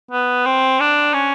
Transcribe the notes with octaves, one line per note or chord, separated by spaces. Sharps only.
B3
C4
D4
C#4